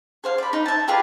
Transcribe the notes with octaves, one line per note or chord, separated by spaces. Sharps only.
G#4 C5 F5
D5 B5
D#4 B5
E5 A5
F4 G4 G#4 B4